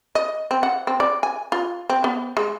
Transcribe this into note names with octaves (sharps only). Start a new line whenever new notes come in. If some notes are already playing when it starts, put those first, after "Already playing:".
D#5
C4
F#5
C4
D5
G#5
F4
C4
B3
G#3